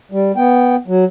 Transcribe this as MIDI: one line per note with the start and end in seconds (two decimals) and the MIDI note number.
0.12 0.32 55
0.36 0.76 59
0.36 0.76 79
0.88 1.05 54